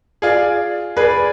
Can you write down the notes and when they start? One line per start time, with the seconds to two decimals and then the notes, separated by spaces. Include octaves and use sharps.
0.22 F4 G#4 D5
0.96 G#4 B4 D5